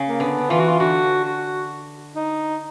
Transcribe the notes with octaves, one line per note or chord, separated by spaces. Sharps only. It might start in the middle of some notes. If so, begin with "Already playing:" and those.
Already playing: C#3
A#3
D3 B3
E3 F4
F#4
F4
D3 F#4
F#4
D#4